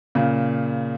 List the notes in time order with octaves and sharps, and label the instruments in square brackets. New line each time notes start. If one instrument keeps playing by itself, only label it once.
[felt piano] A#2 C#3